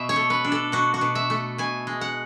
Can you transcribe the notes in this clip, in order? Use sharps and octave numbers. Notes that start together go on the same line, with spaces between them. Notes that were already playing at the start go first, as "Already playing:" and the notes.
Already playing: B2 E5
C#5
A3
B4
D4
A4
B2 F#4
F#4
B2
E5
A3
B2 G#5
G#3
F#5